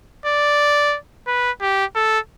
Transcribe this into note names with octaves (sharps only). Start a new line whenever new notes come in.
D5
B4
G4
A4